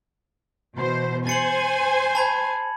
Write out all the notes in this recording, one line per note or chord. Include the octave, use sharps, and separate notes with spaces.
B2 E3 C5
C5 G#5 A6 C#7 F#7
A5 B5 G#6